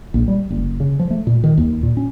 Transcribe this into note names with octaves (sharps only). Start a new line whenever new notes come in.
A#1
G3
F#1
C#3
F3
A3
A#2
D#3
D#2
A#2
C#4